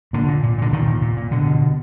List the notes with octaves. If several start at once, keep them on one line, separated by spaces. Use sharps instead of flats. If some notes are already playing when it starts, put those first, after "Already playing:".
A#2 D3
A#2
A#2
A#2 D3
A#2 D#3
A#2
A#2
A#2
B2 D3
B2
B2